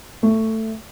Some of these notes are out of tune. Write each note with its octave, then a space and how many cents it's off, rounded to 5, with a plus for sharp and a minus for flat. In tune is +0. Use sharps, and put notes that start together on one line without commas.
A3 +10